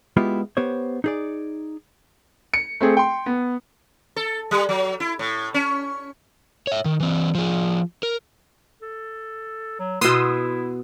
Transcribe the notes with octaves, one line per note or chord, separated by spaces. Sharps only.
G#3 B3 E4 F4 G4
B3 G4 C5 C#5
D#4 G#4 D5
C#7
A3 C4 G#4
G5 C6
B3
A4
G3
F#3
E4
A2
C#4
C#5 E5
D#3
E3 C4
F3 G#4
A#4
A4
F#3
B2 B3 E4 C6 D#6 E6